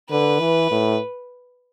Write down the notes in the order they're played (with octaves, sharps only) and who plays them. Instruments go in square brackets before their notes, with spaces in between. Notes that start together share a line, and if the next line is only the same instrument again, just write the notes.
[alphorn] D3 [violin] B4
[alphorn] E3
A2